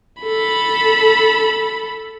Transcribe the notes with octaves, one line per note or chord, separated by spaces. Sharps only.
A4 B5